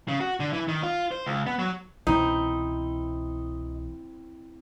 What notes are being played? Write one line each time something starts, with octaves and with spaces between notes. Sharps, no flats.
C#3
F#4
D3
E3
D#3
F4
C5
C#2
B3
F#3
C2 B2 E3 C4 D#4 E4